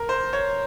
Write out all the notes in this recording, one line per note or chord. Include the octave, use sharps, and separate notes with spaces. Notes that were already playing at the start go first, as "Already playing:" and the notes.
Already playing: A#4
C5
C#5